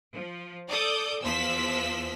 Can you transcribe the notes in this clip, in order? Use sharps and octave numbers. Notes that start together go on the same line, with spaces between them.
F3
A4 D5 D6 D#6 G6
E2 F3 C5 E6 B6